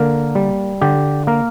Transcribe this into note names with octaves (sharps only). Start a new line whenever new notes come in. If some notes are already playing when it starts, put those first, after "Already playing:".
Already playing: D3 A#3 A#4
G3
D3 G4
A#3 A#4